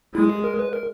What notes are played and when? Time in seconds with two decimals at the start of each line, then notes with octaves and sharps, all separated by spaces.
0.14 G#3 E4
0.30 G#4
0.44 A#4
0.59 B4
0.73 A#4